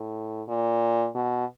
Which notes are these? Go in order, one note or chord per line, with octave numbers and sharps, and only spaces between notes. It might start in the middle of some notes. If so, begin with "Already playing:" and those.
Already playing: A2
A#2
B2